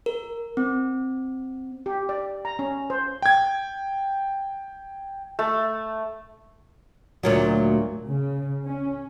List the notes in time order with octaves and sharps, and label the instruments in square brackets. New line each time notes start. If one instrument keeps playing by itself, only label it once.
[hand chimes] A#4
C4
[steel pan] G4
D5
A#5
C#4
C5
[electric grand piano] G5 G#6
[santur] A3
[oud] D2 A#2 F#3
[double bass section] C#3
C#4